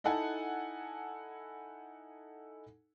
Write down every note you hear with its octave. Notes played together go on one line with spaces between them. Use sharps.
D#4 E4 A4 F#5 G#5 A5